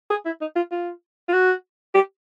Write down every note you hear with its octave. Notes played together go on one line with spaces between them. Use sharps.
G#4
E4
D#4
F4
F4
F4
F#4
G4